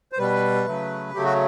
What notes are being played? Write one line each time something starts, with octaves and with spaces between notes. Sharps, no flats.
C5
B2 G3 B4
C#3 F#3 A3
C#3 F#3 A3 G4
F#4